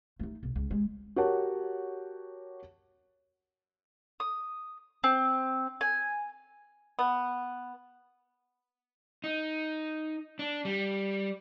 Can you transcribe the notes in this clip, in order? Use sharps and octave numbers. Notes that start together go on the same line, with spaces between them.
A3 D#4
B1
C#2
G#3
F#4 G4 A#4 C#5 F#5 A5
D#6
C4
G#5
B3
D#4
D4
G3